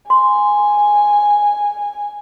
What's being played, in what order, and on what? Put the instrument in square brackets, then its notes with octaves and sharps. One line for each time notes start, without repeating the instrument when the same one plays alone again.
[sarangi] G#5 [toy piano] C6